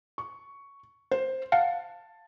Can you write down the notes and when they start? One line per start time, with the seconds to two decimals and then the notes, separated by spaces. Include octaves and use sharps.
0.18 C#6
1.11 C5
1.52 F5 F#5 A5